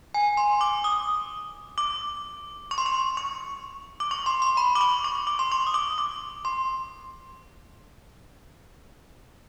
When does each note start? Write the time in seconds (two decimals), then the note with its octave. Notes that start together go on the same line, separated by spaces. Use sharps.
0.14 G#5
0.37 C6
0.61 D6
0.84 D#6
1.78 D6
2.71 C#6
2.78 C6
2.86 C#6
3.17 C#6
4.00 D6
4.11 C#6
4.26 C6
4.42 C6
4.57 B5
4.76 D6
4.81 C#6
5.04 C#6
5.27 D6
5.39 C6
5.52 C#6
5.67 D#6
5.74 D6
5.98 D6
6.45 C6